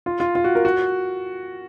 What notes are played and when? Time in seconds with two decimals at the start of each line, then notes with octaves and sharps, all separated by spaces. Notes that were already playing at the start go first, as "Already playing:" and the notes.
0.06 F4
0.20 F4
0.35 F4
0.44 F#4
0.55 A#4
0.65 F#4